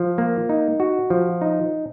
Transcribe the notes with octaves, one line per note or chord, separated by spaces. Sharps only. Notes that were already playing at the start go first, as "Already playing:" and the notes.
Already playing: F3
A#3
D#4
F#4
F3
D#4